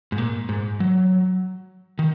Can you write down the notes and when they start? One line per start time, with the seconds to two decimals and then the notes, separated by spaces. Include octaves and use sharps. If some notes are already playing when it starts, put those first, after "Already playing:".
0.12 G#2
0.18 A#2
0.49 G#2
0.80 F#3
1.99 D#3